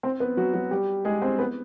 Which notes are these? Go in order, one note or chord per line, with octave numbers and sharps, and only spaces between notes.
C4 C5
B3 B4
F#3 F#4
F#3 F#4
G3 G4
G#3 G#4
C4 C5
B3 B4